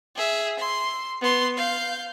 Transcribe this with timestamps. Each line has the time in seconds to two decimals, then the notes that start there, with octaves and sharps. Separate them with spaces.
0.16 G#4 E5
0.59 C6
1.21 B3 C6
1.57 F5 G6